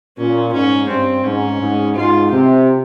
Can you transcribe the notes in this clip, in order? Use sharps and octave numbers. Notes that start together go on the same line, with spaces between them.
A#2 C#4
G#2 C#4
G2 C4
G#2 C#4
G#2
G#2 F4
C3 G4